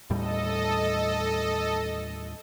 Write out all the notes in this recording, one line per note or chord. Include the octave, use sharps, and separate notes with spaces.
D#2 A2 G3 A4 D#5